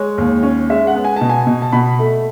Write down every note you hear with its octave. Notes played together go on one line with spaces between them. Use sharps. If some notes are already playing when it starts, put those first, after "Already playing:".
Already playing: G#3 C#5
D#2
C#4
G#3 E5
F#5
B3
G#5
B2 A5
G#5
B2
A5
B2 B5
A3